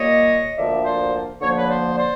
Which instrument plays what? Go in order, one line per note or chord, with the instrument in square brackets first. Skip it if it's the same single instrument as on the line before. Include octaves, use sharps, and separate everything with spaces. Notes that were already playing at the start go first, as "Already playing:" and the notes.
Already playing: [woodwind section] A#2 G3 A#3 C#5 D#5
D2 D3 F3 A#3 D5 E5
C5 D5
D2 D3 F3 A#3 C#5
C5
B4 C#5
C5 D5
C5 D5